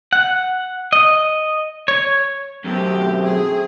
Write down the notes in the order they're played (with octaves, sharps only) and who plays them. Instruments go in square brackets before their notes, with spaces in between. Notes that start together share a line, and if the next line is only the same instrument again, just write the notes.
[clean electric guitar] F#5
D#5
C#5
[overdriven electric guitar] F#2 B2 [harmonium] A3 C4 [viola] G4
[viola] G#4